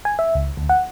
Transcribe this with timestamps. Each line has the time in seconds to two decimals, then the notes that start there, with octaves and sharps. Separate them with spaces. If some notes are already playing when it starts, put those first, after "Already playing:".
0.05 G#5
0.19 E5
0.35 C#2
0.57 D2
0.69 F#5